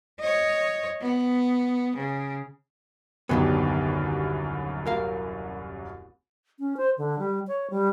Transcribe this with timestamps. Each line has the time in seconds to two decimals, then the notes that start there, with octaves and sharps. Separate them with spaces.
0.19 C#5 D#5
1.01 B3
1.97 C#3
3.29 D#1 C2 F#2 D3 D#3 B3
4.86 A#4 F5
6.59 C#4
6.77 C5
6.98 D3
7.19 G3
7.48 C#5
7.70 G3